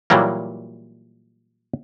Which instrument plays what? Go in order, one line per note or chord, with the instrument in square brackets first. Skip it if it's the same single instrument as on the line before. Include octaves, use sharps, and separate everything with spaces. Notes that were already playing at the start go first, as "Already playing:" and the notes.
[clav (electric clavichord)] A#2 E3 F#3 G3 A#3